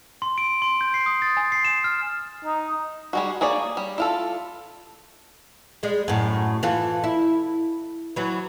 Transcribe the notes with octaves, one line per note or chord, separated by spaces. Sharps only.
C6
D7
C6
G6
C7
D#6
A6
G#5
C7
E7
F6
D#4
G3 G#3 F#4
A#3 G#4 C#5 D5
G3
E4 F4 A4
G3 G#3
F#2 A2
E3 F4 A4
E4
E3 F#3